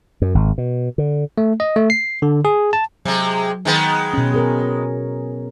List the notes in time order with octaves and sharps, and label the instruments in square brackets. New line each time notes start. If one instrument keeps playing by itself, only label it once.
[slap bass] F#2
G#1
B2
D3
[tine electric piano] A3
D#5
A3
C7
D3
G#4
A5
[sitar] C3 G#3 [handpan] F#3
[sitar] D#3 G#3 B3
[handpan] B2 C#4
G#4 A#4 C#5